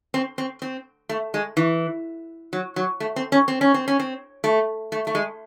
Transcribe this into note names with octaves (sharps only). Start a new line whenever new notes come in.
C4
C4
C4
A3
G#3
E3
F#3
F#3
A3
C4
C#4
C4
C#4
C4
C#4
C4
A3
A3
A3
G#3